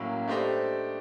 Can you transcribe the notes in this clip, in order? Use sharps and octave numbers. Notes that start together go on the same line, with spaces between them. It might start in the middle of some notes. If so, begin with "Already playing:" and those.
Already playing: A2 F#3 A#3 C#4
A3 D4 G4 C5 D#5